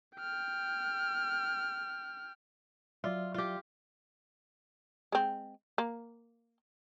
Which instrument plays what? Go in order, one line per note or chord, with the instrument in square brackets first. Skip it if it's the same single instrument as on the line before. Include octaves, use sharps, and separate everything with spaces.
[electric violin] G5 F6
[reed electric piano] F#3 D5 E5 [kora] F4
[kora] F4 G4
[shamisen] G#3 C4
A#3